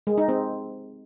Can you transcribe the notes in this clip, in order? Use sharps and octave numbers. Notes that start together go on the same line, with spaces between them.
G#3
D#4
C4